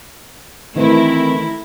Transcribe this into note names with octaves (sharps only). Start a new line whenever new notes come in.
D#3 E3 A3 C4 E4 A#4